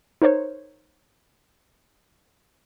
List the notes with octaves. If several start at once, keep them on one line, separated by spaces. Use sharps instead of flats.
D#4 A#4 C5 C#5